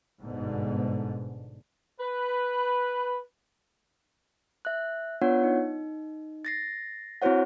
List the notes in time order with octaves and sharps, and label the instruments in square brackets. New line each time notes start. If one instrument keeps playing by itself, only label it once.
[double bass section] G1 G#2 B2 D3
[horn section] B4
[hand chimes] E5 F#6
B3 D4 F4 C#5 F#5
D#4
A6 A#6 C7
C4 E4 F#4 C5 C#5 F#5